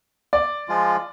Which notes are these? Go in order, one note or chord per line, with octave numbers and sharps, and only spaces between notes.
D5
F3 G#3 F4